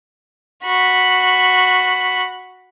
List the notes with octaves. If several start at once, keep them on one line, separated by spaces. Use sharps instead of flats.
F#4 B5